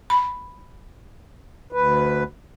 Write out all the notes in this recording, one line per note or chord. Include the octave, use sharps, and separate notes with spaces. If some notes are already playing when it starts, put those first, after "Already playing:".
B5
D2 B4